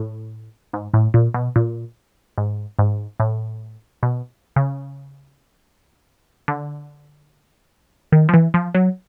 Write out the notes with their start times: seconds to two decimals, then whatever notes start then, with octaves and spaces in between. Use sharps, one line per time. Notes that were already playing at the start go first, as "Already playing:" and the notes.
Already playing: A2
0.73 G#2
0.94 A2
1.14 A#2
1.34 B2
1.56 A#2
2.38 G#2
2.79 G#2
3.20 A2
4.03 B2
4.56 C#3
6.48 D3
8.12 D#3
8.29 F3
8.34 E3
8.54 F3
8.75 F#3